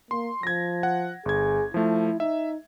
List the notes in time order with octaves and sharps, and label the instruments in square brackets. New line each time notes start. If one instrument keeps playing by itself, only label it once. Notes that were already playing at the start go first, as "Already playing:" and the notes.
[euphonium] A#3 [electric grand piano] C6
[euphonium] F3 [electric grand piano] G#6 A#6
[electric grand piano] F#5
[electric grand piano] G1 G#6 [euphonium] G#4
[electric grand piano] F3 A3 [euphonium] E4
[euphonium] D#4 [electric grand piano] E5